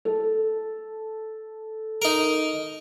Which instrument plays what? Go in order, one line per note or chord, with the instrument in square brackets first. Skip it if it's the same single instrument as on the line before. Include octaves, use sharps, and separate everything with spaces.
[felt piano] A4
[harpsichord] D#4 A#4